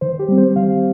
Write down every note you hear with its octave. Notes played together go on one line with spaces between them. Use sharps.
D#3 C5
G4
G3 C4
C5
D#3 F5